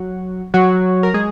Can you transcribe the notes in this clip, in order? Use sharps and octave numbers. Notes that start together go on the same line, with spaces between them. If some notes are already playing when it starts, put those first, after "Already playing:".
Already playing: F#3 F#4
F#3 F#4
A#4
G#3 G#4